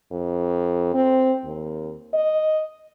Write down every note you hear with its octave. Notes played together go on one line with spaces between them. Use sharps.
F2
C4
D#2
D#5